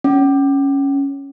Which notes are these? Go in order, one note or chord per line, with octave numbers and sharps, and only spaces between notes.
C#4